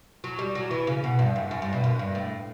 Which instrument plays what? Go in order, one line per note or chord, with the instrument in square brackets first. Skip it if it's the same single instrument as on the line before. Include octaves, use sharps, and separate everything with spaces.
[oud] F#3
G3
F#3
E3
C#3
B2
G2
F#2
F#2
G2
B2
F#2
G2
A2